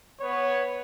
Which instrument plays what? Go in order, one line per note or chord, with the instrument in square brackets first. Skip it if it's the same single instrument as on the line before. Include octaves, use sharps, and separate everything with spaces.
[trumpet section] B3 C#5